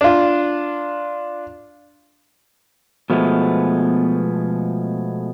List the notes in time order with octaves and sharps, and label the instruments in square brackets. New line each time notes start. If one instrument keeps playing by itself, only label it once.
[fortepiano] D4 F4
[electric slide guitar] B2 F3 G#3 A3 B3